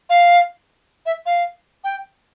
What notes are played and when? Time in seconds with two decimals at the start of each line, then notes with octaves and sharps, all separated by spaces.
0.10 F5
1.06 E5
1.26 F5
1.84 G5